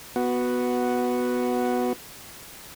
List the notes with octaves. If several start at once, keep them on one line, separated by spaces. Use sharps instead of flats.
B3 F#4